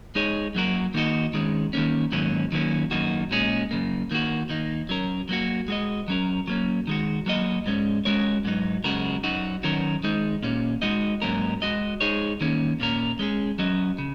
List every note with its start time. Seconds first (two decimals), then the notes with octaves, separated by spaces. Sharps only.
0.15 G#3 D#4 G#4 C#5
0.55 F#2 F#3 A#3 F#4 A#4
0.94 D#3 A#3 D#4 F#4 D#5
1.34 D#3 G#3 C#4
1.73 D#3 A#3 C#4
2.12 G#2 D#3 F#3 A#3 C#4
2.52 D#3 F#3 A#3 C#4
2.91 F#2 D#3 A#3 D#4 F#4
3.31 A#2 G#3 C#4 G#4
3.71 F#2 C#3 A#3
4.11 D#3 A#3 F#4
4.50 D#3 A#3 D#4
4.89 F#3 C#4 A#4
5.29 F#3 A#3 F#4
5.68 G#3 F#4 D#5
6.08 F#3 C#4 A#4
6.47 F#3 A#3 C#4
6.87 D#3 G#3 F#4
7.26 F#3 A#3 F#4 D#5
7.66 G#2 G#3 C#4
8.05 G#3 C#4 F#4 A#4 C#5
8.45 G#2 F#3 D#4
8.84 F#2 C#3 G#3 F#4 A#4
9.24 F#2 F#3 D#4 F#4
9.63 D#3 F#3 C#4 F#4 A#4
10.03 D#3 G#3 D#4
10.43 A#2 A#3 C#4
10.82 G#3 D#4 F#4 D#5
11.22 G#2 F#3 A#3 C#4 A#4
11.62 G#3 F#4 D#5
12.01 G#3 D#4 G#4 C#5
12.41 D#3 A#3 C#4
12.80 A#2 A#3 C#4 A#4
13.19 G#3 C#4 G#4
13.59 F#3 C#4 F#4 D#5
13.98 C#3